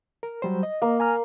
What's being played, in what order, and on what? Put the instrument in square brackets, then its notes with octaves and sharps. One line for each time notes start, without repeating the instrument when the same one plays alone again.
[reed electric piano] A#4
F#3 G3 C5
D#5
[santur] A#3
[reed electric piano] G#5 A#5 F6